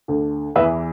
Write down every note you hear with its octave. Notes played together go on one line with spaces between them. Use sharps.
D2 D3
E2 E3 B4 E5